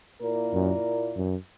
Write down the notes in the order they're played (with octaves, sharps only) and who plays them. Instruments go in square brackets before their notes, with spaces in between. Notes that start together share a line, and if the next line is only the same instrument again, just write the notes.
[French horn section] A#2 A#3 E4 A#4 D5
[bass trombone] F#2
F#2